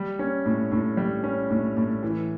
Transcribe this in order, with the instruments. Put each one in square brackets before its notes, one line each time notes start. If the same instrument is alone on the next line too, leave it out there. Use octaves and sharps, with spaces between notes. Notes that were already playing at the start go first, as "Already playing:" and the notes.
Already playing: [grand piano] G3
C#4
A2
A2
G3
C#4
A2
A2
E3